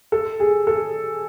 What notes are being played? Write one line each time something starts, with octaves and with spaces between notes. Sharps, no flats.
A4
G#4
A4